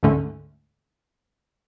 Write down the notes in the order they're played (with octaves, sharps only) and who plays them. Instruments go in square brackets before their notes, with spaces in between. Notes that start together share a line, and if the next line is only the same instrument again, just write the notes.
[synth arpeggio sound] D2 G#2 D3 A3 C#4